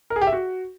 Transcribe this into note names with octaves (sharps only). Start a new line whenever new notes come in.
A#4
G#4
G4
E5
F#4